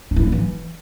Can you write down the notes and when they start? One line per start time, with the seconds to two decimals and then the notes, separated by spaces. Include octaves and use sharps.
0.11 D4
0.16 E4
0.22 G#3
0.27 G3
0.32 E3